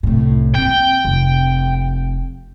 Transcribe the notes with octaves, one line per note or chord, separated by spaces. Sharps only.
C2 A2
A#3 C4 G5
F1